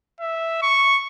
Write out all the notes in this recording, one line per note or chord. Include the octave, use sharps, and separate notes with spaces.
E5
C#6